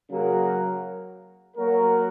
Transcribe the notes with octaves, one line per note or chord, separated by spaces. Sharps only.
C#3 F#3 A#3 F#4 A#4
F#3 A#3 F#4 A#4